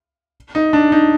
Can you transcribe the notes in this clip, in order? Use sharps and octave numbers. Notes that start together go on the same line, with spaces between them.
D#4
D4
D#4